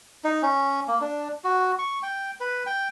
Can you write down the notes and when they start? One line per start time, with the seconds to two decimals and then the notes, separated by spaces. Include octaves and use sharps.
0.24 D#4
0.42 C#4
0.88 A#3
1.01 D4
1.44 F#4
1.79 C#6
2.03 G5
2.40 B4
2.67 G5